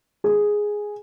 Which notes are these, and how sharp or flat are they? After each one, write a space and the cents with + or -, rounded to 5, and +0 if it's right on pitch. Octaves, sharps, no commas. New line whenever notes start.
G#4 +0